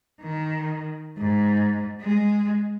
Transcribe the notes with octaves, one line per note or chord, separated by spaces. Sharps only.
D#3
G#2
G#3